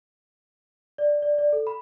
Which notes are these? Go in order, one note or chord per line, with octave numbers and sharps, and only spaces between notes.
D5
D5
D5
A4
B5